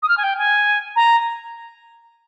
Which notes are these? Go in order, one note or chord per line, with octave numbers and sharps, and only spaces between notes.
D#6
F6
G#5
G5
G#5
A#5